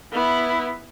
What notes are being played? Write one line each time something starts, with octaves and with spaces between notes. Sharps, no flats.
B3 E4